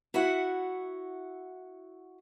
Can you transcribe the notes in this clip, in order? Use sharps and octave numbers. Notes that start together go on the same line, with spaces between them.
E4 F#4 E5 F#5